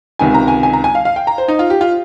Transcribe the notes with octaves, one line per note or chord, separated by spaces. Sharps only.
C#2 C3 D#3 G#5
A#5
G#5
G#5
A#5
G#5
F5
F5
G5
A#5
C5
D#4
F4
G4
F4